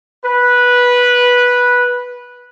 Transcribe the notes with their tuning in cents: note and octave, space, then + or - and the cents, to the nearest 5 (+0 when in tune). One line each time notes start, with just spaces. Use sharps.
B4 -10